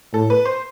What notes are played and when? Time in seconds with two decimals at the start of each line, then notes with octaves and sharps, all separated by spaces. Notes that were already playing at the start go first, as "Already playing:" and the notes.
0.14 A2 A4
0.30 B4
0.45 C5